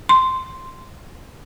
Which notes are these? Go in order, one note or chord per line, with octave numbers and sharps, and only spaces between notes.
C6